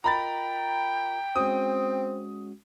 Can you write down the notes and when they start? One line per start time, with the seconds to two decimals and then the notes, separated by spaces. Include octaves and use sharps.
0.04 F4 A#4 D#5 G5 A#5 B5 A6
1.36 G#3 C4 C#4 F#4 D#6